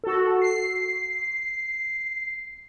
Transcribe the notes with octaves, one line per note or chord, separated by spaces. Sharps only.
F#4 A4
C7